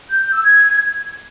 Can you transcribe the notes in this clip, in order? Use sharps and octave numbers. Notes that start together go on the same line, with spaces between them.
G6
G6
E6
G#6